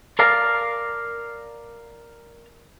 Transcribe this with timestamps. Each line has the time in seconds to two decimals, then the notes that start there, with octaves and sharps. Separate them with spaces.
0.19 A#4 D5 F5 A5 A#5